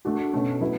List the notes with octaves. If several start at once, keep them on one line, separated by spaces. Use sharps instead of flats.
A3 D4 F#4
B2 A3 C#4
F#3 B3 E4